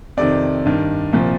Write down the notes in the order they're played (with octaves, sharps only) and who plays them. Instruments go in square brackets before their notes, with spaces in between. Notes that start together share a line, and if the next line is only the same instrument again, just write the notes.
[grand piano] F2 C3 D#3 D5
G2 D#3
C2 A#2 F3